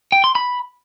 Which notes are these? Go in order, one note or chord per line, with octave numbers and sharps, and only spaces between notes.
G5
C6
B5